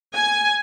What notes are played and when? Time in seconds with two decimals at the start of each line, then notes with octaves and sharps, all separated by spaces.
0.13 G#5